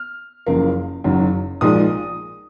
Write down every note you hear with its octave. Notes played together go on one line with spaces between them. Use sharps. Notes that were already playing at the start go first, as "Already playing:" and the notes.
Already playing: F6
F#1 F#2 C#3 F3 A#3
F#1 F#2 D#3 F#3
A#1 A#2 F3 G#3 D#4 D#6